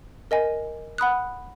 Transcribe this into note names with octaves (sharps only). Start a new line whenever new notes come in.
A#4 D#5 G#5
F#5 B5 D#6 F#6